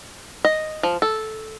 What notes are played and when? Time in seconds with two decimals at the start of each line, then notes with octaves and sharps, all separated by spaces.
0.45 D#5
0.83 F3
1.02 A4